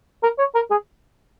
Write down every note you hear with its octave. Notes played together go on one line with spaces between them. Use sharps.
A#4
C#5
A#4
G#4